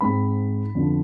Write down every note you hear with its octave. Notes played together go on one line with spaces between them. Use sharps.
G#2 G#3 C4 B5
F2 D3 F3 B3